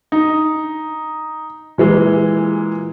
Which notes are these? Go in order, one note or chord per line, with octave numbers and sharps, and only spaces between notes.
D#4
A#2 E3 G#3